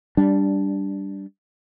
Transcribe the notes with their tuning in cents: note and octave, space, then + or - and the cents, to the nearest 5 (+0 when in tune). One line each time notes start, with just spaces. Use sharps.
G3 +0 D4 -10